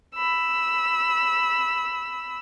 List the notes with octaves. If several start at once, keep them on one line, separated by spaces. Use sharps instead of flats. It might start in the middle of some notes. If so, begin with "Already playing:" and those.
B5 E6